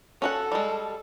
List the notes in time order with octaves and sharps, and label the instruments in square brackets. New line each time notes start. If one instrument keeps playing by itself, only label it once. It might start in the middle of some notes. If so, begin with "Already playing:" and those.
[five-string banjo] C#4 F#4 F#5 [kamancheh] A4
[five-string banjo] G3 G#3